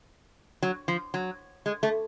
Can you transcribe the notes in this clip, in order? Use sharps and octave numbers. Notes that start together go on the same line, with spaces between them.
F#3
F3
F#3
G#3
A3